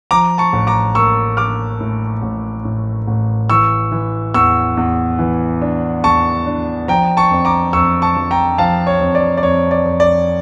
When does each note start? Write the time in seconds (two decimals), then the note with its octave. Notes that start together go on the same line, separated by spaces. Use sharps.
0.11 F3 A#5 D6
0.38 A5 C#6
0.53 A1
0.67 A#5 D6
0.95 A#3 C#6 E6
1.37 A#3 D6 F6
1.80 A2
2.22 A1
2.65 A2
3.07 A1
3.50 E3 C#6 E6
3.92 E3
4.34 E2 C#6 E6
4.77 E2
5.19 E3
5.62 D4
6.04 E2 A5 C#6
6.46 D4
6.88 F3 G5 A#5
7.17 A5 C#6
7.31 F2
7.45 A#5 D6
7.73 F2 C#6 E6
8.02 A5 C#6
8.16 F3
8.31 G5 A#5
8.58 F3 F5 A5
8.87 C#5
9.01 F2
9.15 D5
9.37 D5
9.43 F2 C#5
9.71 D5
9.85 F2
10.00 D5